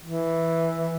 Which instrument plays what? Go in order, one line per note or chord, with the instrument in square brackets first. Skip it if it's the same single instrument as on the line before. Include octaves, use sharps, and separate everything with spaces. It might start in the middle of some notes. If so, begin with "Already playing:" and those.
[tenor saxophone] E3